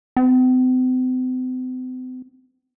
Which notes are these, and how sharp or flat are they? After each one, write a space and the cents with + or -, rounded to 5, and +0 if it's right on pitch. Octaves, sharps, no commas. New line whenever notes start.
C4 -45